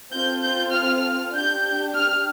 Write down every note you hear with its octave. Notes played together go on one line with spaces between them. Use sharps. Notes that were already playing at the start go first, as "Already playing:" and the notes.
C4 F4 A4 G6
G6
F6
D4 G4 G6
F6